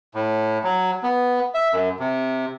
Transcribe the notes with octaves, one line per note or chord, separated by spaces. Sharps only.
A2
F#3
B3
E5
F#2
C3